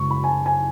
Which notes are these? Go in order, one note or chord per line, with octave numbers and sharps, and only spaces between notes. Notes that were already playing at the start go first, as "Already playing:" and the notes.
Already playing: F#2 C#3 G#3 C#6
B5
G#5
A5
G#5